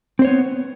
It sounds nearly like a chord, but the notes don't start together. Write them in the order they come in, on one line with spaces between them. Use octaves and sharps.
C4 C5 C#5 B3